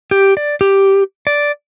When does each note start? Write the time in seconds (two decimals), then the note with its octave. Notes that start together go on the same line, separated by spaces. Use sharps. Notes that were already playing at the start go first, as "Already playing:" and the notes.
0.11 G4
0.37 D5
0.61 G4
1.27 D5